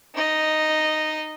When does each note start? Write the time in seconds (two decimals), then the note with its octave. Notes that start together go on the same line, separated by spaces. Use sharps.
0.15 D#4 D#5